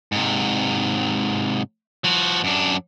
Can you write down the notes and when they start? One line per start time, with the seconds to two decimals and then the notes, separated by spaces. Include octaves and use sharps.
0.12 G#2 C3
2.04 F3 F#4
2.44 F#2 D4